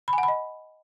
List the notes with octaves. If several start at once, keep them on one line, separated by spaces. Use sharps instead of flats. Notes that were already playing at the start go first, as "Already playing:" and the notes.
B5
G#5
F#5
B5
D#5